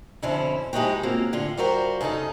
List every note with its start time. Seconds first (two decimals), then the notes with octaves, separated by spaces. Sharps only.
0.22 F2 B2 D3 C4 C#4 E4
0.73 F3 G#3 D#4 E4 F#4 G4
1.03 G#3 A#3 C4 C#4 F4 F#4
1.33 A2 D3 F4
1.57 G3 F4 F#4 A#4 C5
2.01 F#2 C#3 D4 D#4 A4